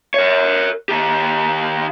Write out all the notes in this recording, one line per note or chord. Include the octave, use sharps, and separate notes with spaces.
A#4 C#5
D#3 G4